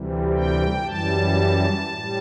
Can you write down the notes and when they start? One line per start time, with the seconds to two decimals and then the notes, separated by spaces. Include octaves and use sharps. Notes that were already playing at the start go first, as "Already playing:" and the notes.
Already playing: D2 C3 E3 G3
0.34 G5
0.85 F#2 E3 G3 A5
1.86 A2 G3